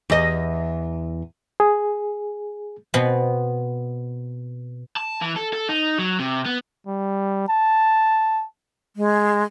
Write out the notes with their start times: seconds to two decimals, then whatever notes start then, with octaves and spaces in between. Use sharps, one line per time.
0.10 E2 D#5
1.60 G#4
2.94 B2 B3 C4
4.97 A5
5.22 E3
5.36 A4
5.53 A4
5.69 D#4
5.99 F#3
6.20 C3
6.46 B3
6.86 G3
7.49 A5
8.96 G#3